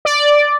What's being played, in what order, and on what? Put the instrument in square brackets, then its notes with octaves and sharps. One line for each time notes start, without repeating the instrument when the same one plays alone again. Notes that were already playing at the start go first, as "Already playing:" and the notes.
[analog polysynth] D5